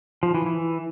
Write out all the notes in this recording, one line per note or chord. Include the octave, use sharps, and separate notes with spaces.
F3
E3
E3